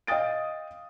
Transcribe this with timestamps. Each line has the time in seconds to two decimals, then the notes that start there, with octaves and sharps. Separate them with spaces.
0.07 D#5 F5 G5 D#6 A6 D7